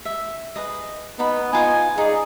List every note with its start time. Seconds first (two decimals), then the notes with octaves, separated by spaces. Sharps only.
0.05 E5
0.56 G#4 B4 D#5
1.19 B3 D#4 B5
1.53 D#4 F4 G#5 D#6
1.98 D#4 G#4 D5